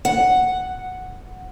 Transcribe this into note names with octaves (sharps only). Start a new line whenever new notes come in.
F#5